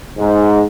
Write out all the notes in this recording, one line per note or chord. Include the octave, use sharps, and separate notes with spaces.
G#2